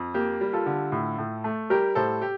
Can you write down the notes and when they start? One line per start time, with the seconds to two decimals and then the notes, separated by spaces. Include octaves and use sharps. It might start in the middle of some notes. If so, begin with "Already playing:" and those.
Already playing: F2
0.14 A#3 G4
0.41 G3
0.53 F4 A4
0.66 D3
0.92 A2
1.18 A2
1.44 A3
1.70 G3 G4 A#4
1.95 A2 A4 C5
2.22 G4